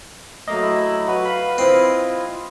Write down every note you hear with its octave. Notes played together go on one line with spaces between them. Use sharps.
F#3 A3 A#3 D#5
E4
F#4 B4
F5 B5
C4 E4 F4 D#5